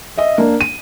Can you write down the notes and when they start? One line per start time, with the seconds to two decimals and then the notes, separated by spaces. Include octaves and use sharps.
0.18 D#5 E5
0.38 A#3 D4
0.61 D#7